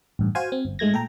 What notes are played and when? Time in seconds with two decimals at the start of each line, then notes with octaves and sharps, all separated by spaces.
0.19 A1 G2
0.35 F#4 C5 F5 G#5
0.52 C4
0.65 G1
0.79 G#2 G#3 A3 G#6 A#6
0.93 A#2 A4 G5 A#5